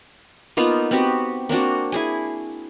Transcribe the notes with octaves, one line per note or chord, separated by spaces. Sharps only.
A#3 B3 D#4 F4
B3 C4 F#4 G4
A#3 C4 D4 F#4
E4 G#4 G#5